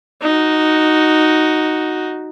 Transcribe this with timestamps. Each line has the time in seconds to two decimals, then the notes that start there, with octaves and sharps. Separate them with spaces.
0.22 D#4 F#4